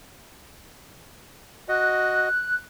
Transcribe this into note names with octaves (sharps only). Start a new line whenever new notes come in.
F#4 D#5 F#6